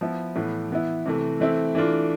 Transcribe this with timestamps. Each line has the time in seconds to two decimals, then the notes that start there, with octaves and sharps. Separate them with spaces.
0.01 F3 B3 E4
0.35 A2 E3 B3
0.71 E3 B3 E4
1.06 C3 E3 A3
1.40 E3 A3 C4 E4
1.75 E3 A3 D4 F4